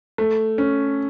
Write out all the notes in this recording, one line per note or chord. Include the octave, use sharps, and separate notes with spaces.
A3
C#4